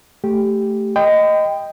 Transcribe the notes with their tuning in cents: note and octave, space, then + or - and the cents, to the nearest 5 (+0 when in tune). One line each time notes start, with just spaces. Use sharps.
A3 +0 G4 +0
D#5 +0 G5 +10 B5 +45